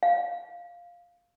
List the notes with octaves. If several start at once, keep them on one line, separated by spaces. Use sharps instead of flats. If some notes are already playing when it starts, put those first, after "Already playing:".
F5